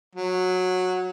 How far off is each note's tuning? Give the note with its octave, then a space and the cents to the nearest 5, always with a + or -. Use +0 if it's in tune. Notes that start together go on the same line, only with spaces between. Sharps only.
F#3 -10